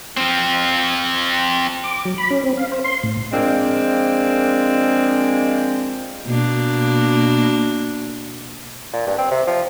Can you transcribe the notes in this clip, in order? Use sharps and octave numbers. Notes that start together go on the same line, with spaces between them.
F3 C4
D6
F#3
B5
C#4
C4
F5
C5
C6
A2
F3 G#3 A#3 C4 D4
B2 A#3 D4
A#2
G2
C4
C3
F3